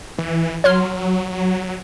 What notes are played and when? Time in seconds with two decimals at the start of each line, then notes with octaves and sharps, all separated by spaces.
0.18 E3
0.64 F#3 C#5 C6 F6